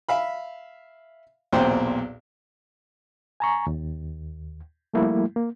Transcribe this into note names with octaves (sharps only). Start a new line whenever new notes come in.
E5 F5 B5
B1 E2 A#2 C4 C5 G5
G#5 A#5 C#6
D#2
F3 G3 A3 A#3 E4
A#3